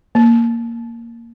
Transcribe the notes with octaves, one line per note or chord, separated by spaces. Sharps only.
A#3